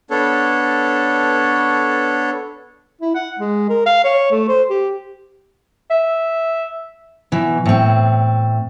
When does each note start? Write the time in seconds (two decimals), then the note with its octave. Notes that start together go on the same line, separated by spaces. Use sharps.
0.11 B3 D4 A4 C#5
3.02 E4
3.15 F#5
3.40 G#3
3.69 A#4
3.86 F5
4.04 C#5
4.31 A3
4.48 C5
4.70 G4
5.90 E5
7.32 B2 E3
7.66 A2 C4